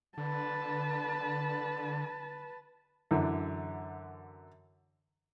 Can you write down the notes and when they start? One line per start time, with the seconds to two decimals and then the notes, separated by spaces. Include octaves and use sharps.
0.18 D3 B4 A5
3.11 F#2 D3 E3